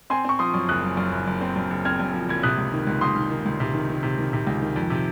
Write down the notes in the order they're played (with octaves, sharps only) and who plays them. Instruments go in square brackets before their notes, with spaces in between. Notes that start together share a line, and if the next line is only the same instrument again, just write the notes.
[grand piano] C4 G#5 C6
C4 C#6
F3 C6 D#6
F#2
F#1 D#6 F#6
F#2
F#2
F#1
F#1
C4
F#2
F#1
C4 F6 G#6
F#2
F3
F#1 G#6
C3 D#6 F#6
C#2
D#3
C#2
C#2 C6 D#6
D#3
D#3
C#2
C3
D#3
D#3
C3
D#3
C3
C#2
D#3
F2
C3